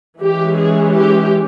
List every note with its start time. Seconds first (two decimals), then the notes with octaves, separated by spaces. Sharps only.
0.19 E3 G#3 C#4 G4
0.56 G#4
0.93 G4